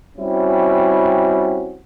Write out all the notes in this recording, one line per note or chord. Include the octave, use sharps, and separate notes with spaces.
G3 C4 C#4 E4 F#4